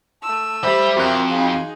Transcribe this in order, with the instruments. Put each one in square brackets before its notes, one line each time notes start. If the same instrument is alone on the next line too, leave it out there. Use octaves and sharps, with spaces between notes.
[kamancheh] A3 E6 [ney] A5
[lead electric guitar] G3 B5 [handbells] G4 C5 [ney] E5
[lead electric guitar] F2 [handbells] F#4 C6 F#6 [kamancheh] A#4 G5
[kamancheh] D#4 G#4 [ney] F5